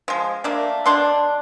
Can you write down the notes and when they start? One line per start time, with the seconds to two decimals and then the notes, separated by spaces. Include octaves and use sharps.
0.08 F3 G#3
0.44 A3 A#3 D4
0.86 B2 D4 C6